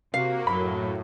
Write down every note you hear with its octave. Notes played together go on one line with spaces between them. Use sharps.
C3 A#3 F#4 F5
F#2 A2 F#3 B5